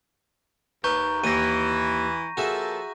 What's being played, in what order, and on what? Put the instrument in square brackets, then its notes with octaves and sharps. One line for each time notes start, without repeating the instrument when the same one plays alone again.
[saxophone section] D#2 [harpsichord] B4 [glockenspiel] A#5 C#6 G6
[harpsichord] D#2 [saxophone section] E3 [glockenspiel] A#6 D#7
[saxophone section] F3 A#3 A4 [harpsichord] F#4 G#4 E5